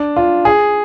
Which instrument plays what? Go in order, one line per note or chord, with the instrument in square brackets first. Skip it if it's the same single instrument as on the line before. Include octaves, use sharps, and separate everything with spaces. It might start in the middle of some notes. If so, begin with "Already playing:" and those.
Already playing: [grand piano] D4
F4
G#4